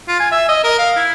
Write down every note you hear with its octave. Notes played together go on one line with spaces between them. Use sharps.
F4
G#5
E5
D#5
A#4
F5
E4